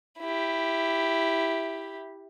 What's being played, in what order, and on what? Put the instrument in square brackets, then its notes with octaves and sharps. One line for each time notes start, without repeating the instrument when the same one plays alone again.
[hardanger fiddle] E4 G4